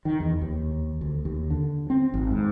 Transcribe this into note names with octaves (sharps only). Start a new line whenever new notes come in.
D#3
E2
D#2
D2
D#2
D3
C4
G#1
G#2